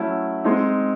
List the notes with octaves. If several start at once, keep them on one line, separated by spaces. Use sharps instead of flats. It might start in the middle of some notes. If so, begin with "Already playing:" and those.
Already playing: F#3 A3 C#4 E4 A4
G#3 C4 D#4